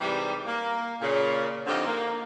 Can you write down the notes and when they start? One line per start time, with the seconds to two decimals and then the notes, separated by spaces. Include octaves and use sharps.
0.01 G#2 C3 E3 G3
0.46 A#3
1.01 A#2 C#3
1.67 F2 D3 C4 D#4 F4 G4
1.86 A#3